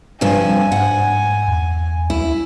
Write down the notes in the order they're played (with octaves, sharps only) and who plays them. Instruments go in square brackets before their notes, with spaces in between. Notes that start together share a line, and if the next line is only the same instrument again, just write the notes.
[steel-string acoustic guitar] G2 C3 F3 [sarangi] G#5
[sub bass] G#2 [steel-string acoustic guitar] F#5
[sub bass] E2
[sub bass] D2 [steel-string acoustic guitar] E4